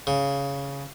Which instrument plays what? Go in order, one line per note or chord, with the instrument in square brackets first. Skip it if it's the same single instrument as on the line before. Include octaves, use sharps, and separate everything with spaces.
[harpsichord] C#3